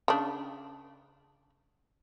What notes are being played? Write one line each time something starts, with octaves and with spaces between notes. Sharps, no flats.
C#3 D4